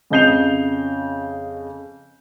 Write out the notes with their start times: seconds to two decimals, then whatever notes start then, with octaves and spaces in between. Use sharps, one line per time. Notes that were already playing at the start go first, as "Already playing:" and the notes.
0.10 F2 C#3 D#5 G6 C7 F7